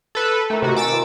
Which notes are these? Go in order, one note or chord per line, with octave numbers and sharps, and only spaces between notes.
A4 B4
A3 G4 A#4
C3 D#3 F#4
G#5 D6 E6 A6
C4 F4 B4